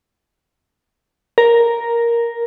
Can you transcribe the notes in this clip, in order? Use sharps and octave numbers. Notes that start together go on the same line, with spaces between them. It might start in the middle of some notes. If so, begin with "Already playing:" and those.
A#4